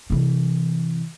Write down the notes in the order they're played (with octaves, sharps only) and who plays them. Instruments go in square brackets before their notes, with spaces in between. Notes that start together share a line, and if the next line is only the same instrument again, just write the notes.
[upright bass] C3 E3